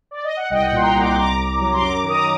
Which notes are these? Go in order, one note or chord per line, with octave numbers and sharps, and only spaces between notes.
D5
D#5
F#5
C2 D#5 G5
F#5
D#5 G5
A#2 C6
G5 A#5
C2
D6
C6
C2 A#5 D6
C2
F#3
C6
F#2 A#5 D6
D#3 D#6
A#5 D6